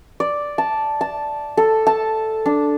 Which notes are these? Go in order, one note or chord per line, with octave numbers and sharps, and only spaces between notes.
D5
A5
A5
A4
A5
D4